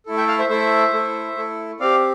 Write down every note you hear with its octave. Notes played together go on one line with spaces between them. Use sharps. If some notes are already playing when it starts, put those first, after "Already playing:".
A3 E4 A4
E5 G5
F5 A5
C5 E5
A3 E4 A4 C5 E5
A3 E4 A4
A3 E4 A4
C4 G4 D5 F5